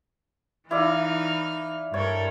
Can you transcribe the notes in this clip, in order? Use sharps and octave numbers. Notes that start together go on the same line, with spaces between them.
E3 D#4 E4 D5 F5 F6
G2 A4 A#4 C#5